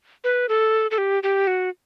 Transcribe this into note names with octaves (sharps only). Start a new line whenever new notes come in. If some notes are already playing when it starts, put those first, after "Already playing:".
B4
A4
A4
G4
G4
F#4